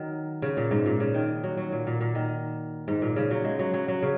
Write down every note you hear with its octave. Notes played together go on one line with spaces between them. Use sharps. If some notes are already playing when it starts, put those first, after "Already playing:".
Already playing: D#3 F#3
C#3
A#2
G#2
A#2
C#3
D#3
F#3
F#3
A#2
A#2
A#2
D#3
G#2
A#2
C#3
F#3
G#3
F#3
F#3
F#3
C#3